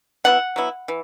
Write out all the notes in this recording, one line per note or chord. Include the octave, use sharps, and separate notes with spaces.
F#3 B3 E4 F#5
F#3 B3 E4
E3